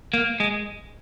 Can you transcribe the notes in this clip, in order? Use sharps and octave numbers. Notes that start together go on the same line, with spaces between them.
A#3
G#3